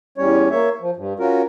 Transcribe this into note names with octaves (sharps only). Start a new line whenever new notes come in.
E2 G3 C#4 C#5
A#3 C#5 E5
F3
G2
C#4 F4 F#4 A#4